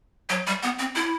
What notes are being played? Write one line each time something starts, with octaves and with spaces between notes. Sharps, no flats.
F#3
G3
B3
C4
E4